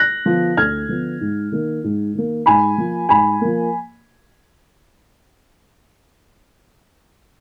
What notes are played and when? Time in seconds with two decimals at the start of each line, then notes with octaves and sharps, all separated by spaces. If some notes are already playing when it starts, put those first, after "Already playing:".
Already playing: F#6 A#6
0.25 D3 F3 B3
0.57 D2 F6 G#6
0.88 D3 F3 B3
1.21 G#2
1.52 D#3 A#3
1.84 G#2
2.14 D#3 A#3
2.46 G#2 G#5 B5
2.78 F3 A#3
3.09 G#2 G#5 B5
3.41 F3 A#3